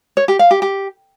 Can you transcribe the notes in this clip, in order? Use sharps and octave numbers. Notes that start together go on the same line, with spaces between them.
C#5
G4
F5
G4
G4